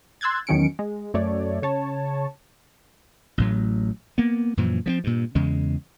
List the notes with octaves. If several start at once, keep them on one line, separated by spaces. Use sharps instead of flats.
C6 E6 F#6 G#6 A6
E2 D#3 F#3 C#4 C#7 D7
G#3
F#2 A3 C#5 D5
C#3 C#5 A5
A1 A2 F#3
A#3 B3
F#2 A#2 E3 F3
F3 A#3 C4
G2 A#2
E2 C#3 G#3